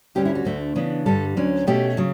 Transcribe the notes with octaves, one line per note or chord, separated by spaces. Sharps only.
D2 D3 G3 C#4 G4
E4
F#4
D2 D3 A3 D4
C#3 E3 B3 D4
G2 D3 G3 A4
D2 D3 F#3 C#4
B2 A3 C#4 G4
C#3 F#3